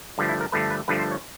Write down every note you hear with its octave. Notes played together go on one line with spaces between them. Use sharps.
G2 D3 F3 A3
E4
A#4
G2 D3 F3 A3 B4
B4
G2 D3 F3 A3 B4
C5
C#5